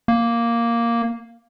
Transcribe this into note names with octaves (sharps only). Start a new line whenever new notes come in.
A#3